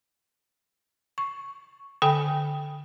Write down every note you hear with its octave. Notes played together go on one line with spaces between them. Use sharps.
C#6
D3 A4 G5 G#5 B5 D#6